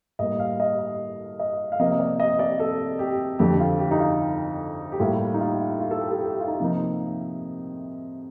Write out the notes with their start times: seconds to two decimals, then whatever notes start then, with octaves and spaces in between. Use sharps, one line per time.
0.19 A2 G3 A#3 D#5
0.40 F5
0.60 D#5
0.79 D#5
1.39 D#5
1.72 F5
1.80 C3 F3 A#3 D#5
1.91 D#5
2.00 D5
2.20 D#5
2.39 D5
2.60 A4
2.99 G4
3.39 F2 D3 F3 G4
3.60 F4
3.79 G4
3.91 D#4
4.00 F4
4.92 G4
5.00 A2 G3 A#3 F4
5.34 D#4
5.40 F4
5.80 F4
5.91 A4
6.00 G4
6.12 A4
6.21 G4
6.40 F4
6.48 D#4
6.60 C3 F3 A#3 D#4